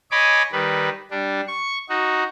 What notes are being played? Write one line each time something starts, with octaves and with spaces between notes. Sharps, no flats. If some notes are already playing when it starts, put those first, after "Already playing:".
C#5 D#5 G#5 B5 D6
D#3 G3 B4
G3 D4
C#6
D#4 F#4